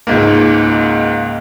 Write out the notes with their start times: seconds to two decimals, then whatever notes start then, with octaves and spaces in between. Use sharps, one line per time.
0.07 C#2 G#2 A#3